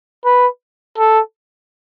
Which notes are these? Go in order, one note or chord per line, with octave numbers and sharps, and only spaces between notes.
B4
A4